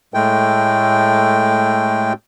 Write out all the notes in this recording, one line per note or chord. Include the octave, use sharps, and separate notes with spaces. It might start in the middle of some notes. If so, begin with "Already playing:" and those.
A2 G#3 A3 G5